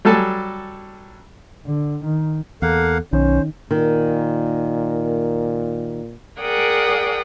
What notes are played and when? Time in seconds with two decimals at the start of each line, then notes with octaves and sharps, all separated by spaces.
0.05 F#3 G3 A4 G#5 A5
1.66 D3
2.05 D#3
2.62 E2 A#3 A4 F5 F#5
3.13 B1 D#3 C#4 C5
3.71 A#2 D#3
6.40 G#4 A#4 D5 F#5 G5 D#6